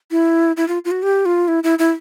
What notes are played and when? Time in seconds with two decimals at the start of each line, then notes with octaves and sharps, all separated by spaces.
0.11 E4
0.57 E4
0.68 F4
0.85 F4
0.91 F#4
1.03 G4
1.26 F4
1.48 E4
1.64 E4
1.79 E4